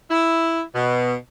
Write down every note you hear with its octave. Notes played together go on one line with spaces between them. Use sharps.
E4
B2